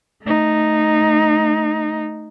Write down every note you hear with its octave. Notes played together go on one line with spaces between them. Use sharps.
A3 D#4